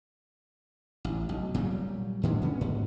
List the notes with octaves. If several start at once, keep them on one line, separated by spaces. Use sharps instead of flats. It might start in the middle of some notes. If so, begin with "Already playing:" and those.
A1
B1
A#2 F#3 G3
A2 D3 F#3 G#3
D3 B3 C#4
G#2